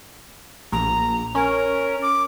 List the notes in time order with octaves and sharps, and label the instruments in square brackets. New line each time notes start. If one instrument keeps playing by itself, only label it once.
[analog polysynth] A#1 [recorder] A#5
[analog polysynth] C#4 [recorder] A#4
[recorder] D6